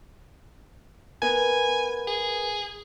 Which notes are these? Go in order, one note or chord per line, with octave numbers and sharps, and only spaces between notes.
B3 A#4 B4 G#5
G#4